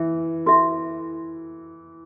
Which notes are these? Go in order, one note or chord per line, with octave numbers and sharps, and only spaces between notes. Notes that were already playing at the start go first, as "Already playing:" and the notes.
Already playing: E3 E5
F#4 A4 E5